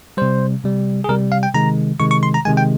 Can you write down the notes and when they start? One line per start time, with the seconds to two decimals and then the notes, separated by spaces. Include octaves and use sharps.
0.17 C3 G3 C5
0.64 C3 G3
1.04 G#4
1.09 C3 G3 A#4
1.32 F5
1.43 G5
1.54 C3 D#3 G#3 A#5
2.00 C3 D#3 G#3 C#6
2.11 C#6
2.23 C6
2.34 A#5
2.45 C3 D#3 G#3 G#5
2.57 G5